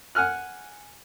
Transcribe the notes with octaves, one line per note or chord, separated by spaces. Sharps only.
F#5 G#5 F6 F#6